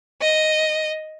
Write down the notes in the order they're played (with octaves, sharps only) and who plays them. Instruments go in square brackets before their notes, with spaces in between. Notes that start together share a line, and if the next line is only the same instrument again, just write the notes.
[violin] D#5